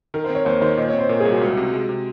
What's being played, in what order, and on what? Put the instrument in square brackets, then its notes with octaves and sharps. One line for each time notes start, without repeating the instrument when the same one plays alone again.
[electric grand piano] D#3 [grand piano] A#4
[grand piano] C5
[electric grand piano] C4 [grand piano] C#5
[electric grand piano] D#2 [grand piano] C5
[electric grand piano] D#3 [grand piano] C5
[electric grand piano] A#2 [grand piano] D#5
[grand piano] C#5
[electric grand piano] C4
[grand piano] C5
[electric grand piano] A#2 [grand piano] A#4
[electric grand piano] C2 [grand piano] G#4
[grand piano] F#4
[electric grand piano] C#2
C3
G#3
C3